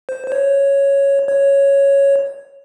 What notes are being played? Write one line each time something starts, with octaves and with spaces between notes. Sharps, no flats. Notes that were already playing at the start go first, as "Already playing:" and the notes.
C5
C5
C#5
C#5